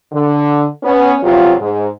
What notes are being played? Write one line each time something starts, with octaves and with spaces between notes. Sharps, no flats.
D3
B3 C#4
E2 C3 F#3 F4
G#2